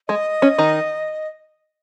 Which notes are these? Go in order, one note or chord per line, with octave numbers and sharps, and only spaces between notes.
G#3 D#5
C#4
D#3 D#4